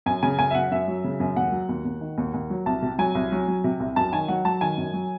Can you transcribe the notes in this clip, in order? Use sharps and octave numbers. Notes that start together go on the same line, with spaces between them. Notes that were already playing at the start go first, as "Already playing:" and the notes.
F#2 G#5
C#3 G#5
F#2 G#5
E5
F#2 F#5
F#2 E5
F#3
C#3
F#2
D#2 F#5
F#3
D#2
D#2
D#3
D#2
D#2
F#3
C2 A5
C3
F#3 G#5
C2
F#3
F#3
C3
C2
F#2 A5
D#3 G#5
F#3 F#5
F#3 A5
D#3 G#5
F#2
F#3